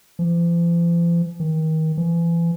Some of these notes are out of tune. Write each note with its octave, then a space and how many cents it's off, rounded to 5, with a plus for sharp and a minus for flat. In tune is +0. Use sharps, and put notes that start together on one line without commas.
F3 -45
D#3 +30
E3 +35